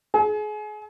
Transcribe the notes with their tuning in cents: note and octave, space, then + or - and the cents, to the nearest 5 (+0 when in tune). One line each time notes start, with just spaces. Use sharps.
G#4 +30